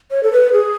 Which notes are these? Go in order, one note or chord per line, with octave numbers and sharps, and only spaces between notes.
C#5
A4
B4
G#4